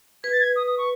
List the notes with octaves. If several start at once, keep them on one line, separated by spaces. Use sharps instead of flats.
B4 G#6
A6
G#6
D#6
D#6
C#6